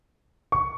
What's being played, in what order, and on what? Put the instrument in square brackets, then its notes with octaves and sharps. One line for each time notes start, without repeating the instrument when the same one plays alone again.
[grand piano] C#6